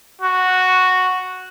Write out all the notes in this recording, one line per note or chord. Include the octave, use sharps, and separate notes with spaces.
F#4